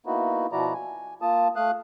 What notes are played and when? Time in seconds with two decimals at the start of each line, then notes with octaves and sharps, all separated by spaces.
0.06 A#3 B3 D#4 E4 F#4
0.52 B2 F3 E4 F#4 D5 A#5
0.73 G#5
1.22 A#3 F4 A5 D#6
1.56 A3 F5 D#6 F#6